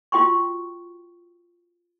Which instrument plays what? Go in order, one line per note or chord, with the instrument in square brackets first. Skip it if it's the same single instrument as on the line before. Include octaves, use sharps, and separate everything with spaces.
[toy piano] F4 F#4 G5 C6 C#6